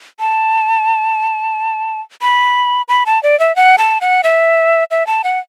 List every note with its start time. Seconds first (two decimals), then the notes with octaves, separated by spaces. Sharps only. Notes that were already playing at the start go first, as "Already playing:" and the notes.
0.20 A5
2.22 B5
2.89 B5
3.06 A5
3.23 D5
3.40 E5
3.56 F#5
3.78 A5
4.01 F#5
4.24 E5
4.91 E5
5.07 A5
5.24 F#5